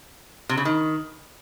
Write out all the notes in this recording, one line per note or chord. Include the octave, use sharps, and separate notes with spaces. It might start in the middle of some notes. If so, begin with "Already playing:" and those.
C3
C#3
D#3